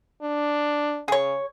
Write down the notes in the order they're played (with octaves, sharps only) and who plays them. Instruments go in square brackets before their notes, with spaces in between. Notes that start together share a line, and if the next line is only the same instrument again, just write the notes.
[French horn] D4
[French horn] C#3 [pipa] G#4 C#5